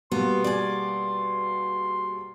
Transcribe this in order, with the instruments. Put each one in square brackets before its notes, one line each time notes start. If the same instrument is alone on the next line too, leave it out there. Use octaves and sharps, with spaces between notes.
[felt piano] B2 G3 A#3 [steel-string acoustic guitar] B3 [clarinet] C6
[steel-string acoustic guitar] G#4 D5